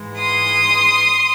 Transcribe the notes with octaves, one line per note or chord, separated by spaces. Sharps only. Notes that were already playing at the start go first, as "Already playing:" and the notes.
Already playing: G#2 E3 G#3
C6 D#6